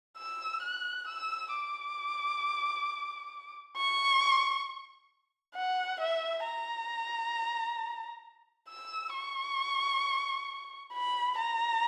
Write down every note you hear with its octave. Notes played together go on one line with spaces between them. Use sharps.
E6
F#6
E6
D6
C#6
F#5
E5
A#5
E6
C#6
B5
A#5